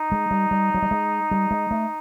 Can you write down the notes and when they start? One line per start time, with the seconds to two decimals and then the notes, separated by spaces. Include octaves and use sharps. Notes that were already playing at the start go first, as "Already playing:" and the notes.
Already playing: D#4
0.12 G#3
0.31 G3
0.51 G3
0.74 F#3
0.82 G3
0.91 G#3
1.31 G3
1.51 G#3
1.71 A3